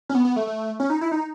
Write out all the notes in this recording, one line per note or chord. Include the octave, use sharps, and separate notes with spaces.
C#4
B3
B3
A3
A3
C#4
D#4
E4
D#4